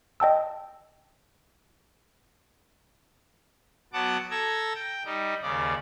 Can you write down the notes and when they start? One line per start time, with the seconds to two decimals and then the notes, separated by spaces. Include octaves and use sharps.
0.20 D#5 G5 A5 E6
3.93 F#3 B3 F#5 A5 D6
4.30 A4 A#5 E6 G#6
4.75 G5
5.05 G3 D#4
5.42 D#2 C#3 D5